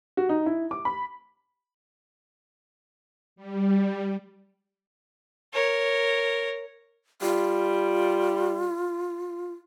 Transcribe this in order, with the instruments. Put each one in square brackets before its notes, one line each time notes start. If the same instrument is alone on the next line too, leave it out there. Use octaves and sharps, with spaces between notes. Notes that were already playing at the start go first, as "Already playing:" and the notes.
[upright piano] F#4
D#4
E4
D6
B5
[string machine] G3
[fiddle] A#4 C#5
[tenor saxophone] G3 [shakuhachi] F4